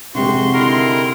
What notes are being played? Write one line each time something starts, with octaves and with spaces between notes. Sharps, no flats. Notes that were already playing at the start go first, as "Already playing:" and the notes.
F2 C3 G#3 F#4 G4 C6 C#6
D3 D#3 E4 A#4